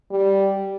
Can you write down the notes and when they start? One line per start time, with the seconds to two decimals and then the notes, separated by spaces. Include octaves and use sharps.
0.11 G3